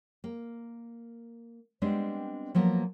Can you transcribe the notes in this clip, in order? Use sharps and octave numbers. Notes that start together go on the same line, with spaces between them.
A#3
G3 G#3 B3 C4 D4
F3 F#3 A#3 B3